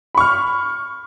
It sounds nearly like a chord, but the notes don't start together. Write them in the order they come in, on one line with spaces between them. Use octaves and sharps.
B5 C#6 F6